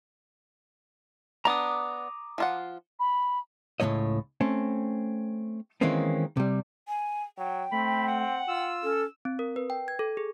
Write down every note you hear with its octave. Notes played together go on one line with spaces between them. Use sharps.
B3 D4 A#5 D6 D#6
F3 F4 F#5
B5
C#2 A2 E3 B3 C#5 D#5
A3 C4 C#4
D#3 E3 G#3 A#3 C4 C#4
C3 G3
G#5
F#3 G5
A3 C4 B5
F#5
F4 E6
C#4 A4
C4
A#4
B4
G5
G#6
A4
G#4